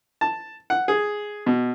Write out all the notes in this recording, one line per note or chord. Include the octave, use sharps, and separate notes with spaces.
A5
F#5
G#4
B2